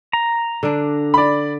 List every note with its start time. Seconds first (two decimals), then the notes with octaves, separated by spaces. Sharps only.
0.13 A#5
0.63 D3 D4
1.14 D5 B5